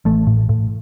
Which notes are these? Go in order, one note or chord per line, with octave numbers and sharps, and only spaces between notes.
A1 A3
A2
A2